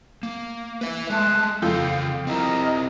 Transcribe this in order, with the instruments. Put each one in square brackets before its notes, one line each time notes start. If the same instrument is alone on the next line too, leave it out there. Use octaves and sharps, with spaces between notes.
[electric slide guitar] A#3
B4 E5
[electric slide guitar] G#3 A3 [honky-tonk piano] E5 [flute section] A5 C6 F#6
[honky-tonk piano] F2 F4 G6 [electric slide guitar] C#3 A4 [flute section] F5
[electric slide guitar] C4 E4 [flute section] A#4 D#5 A#5